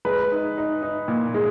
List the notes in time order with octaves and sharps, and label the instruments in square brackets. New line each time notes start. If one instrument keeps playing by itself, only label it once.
[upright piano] G#3 B4
D#4
D#4
D#4
A#2
G#3